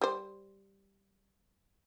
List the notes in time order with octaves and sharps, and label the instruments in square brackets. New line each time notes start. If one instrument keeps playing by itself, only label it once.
[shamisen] G3 C5